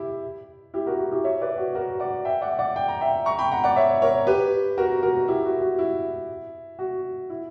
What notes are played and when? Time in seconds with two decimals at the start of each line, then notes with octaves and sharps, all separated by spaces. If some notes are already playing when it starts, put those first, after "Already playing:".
Already playing: E4 G4
0.74 E4 G4
0.87 F#4 A#4
0.99 F#4
1.11 E4 G4
1.24 C#5 E5
1.41 B4 D5
1.58 F#4
1.75 F#4 A#4
1.99 D5 F#5
2.25 E5 G5
2.42 D5 F#5
2.59 D5 F#5
2.76 G5
2.88 A#5
3.01 E5 G5
3.26 A#5 C#6
3.39 G5 B5
3.51 F#5 A#5
3.64 D5 F#5
3.76 C#5 E5
4.02 A#4 C#5
4.27 G4 B4
4.77 F#4 A#4
5.03 F#4 A#4
5.28 E4 G4
5.45 F#4
5.61 F#4
5.79 E4
6.79 F#4
7.30 E4